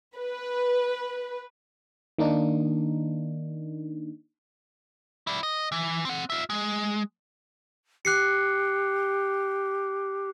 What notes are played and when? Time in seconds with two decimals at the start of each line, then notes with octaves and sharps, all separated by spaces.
0.15 B4
2.18 D#3 A#3 D4 D#4
5.27 E4 D5
5.43 D#5
5.72 E3
6.05 C4 F#5
6.30 F4 E5
6.50 G#3
8.05 G4 F#6 C7 C#7